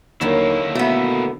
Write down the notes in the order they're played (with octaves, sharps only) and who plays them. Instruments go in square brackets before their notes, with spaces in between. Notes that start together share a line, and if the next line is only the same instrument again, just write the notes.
[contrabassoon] D#2 [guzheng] D3 D#3 F#3 [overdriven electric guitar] A#3 E4
[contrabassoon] B2 [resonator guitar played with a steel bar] A3 B3